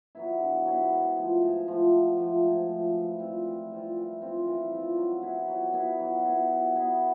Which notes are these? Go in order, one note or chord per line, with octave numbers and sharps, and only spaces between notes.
F#3 B3 E4
D3
F#3 B3 E4
G#2
F3 A3
G#2
F3 A3
G#2
F3 A3
G#2
F3 A3
E3
G3 C4 F4
E3
G3 C4 F4
E3
G3 C4 F4
E3
G3 C4 F4
F#3
B3 E4 G#4
F#3
B3 E4 G#4
F#3
B3 E4 G#4
F#3
B3 E4 G#4